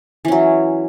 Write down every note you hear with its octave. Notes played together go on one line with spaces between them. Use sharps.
E3 F#3 C#4